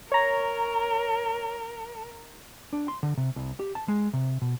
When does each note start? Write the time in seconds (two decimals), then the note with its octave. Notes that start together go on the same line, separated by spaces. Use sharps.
0.12 A#4 C#5 A#5
2.73 D4
2.88 C6
3.03 D3
3.17 C3
3.36 C2
3.59 G4
3.75 A5
3.88 G#3
4.13 C3
4.42 B2